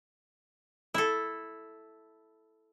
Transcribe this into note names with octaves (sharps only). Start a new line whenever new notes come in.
E4 A4